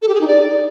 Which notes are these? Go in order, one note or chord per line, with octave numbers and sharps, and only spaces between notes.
A4
G4
G#4
D#4
D5